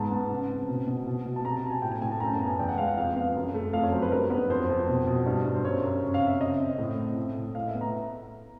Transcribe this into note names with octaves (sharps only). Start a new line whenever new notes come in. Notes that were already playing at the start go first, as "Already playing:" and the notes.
Already playing: G#2 B3 A5
B3
C#3
C4
B2
B2
B2
B2
A5
C3 A#5
A5
C4
G#5
A2 G5
G#5
A2 G#5
A5
F#2 A#5
A5
B3
G#5
E2 G5
F#5
G#3 F5
F#5
F2 F5
B3 F5
F#2
A3
F2 F5
C#5
F#3 C5
B4
G2 A#4
B3 B4
F2 C5
F2
B2
B2
G2
G2
C5
F#2 C#5
F#2
C#3
F5
C4
E5
C#3 D#5
C4
A2
C4
A2
A2
A2 F5
E5
B3
A#5